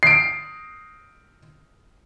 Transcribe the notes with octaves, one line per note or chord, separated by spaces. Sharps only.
C7 D7